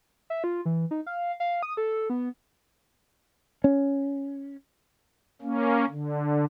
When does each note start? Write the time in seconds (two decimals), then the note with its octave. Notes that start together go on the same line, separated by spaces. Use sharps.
0.30 E5
0.44 F4
0.65 E3
0.91 D#4
1.06 F5
1.40 F5
1.63 D#6
1.77 A4
2.10 B3
3.64 C#4
5.42 A#3 C#4
5.89 D3